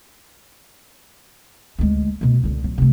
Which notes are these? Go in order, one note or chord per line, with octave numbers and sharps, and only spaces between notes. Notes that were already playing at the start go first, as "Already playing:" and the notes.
D2 G#3
D2 B2
C#2 D3
F#3
C3 A3